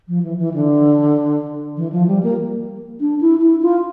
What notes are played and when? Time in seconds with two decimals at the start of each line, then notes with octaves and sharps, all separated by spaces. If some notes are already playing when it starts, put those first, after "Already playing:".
0.08 F3
0.23 E3
0.39 E3
0.54 D3
1.77 E3
1.93 F3
2.08 G3
2.23 A#3
3.00 D4
3.21 E4
3.41 E4
3.62 F4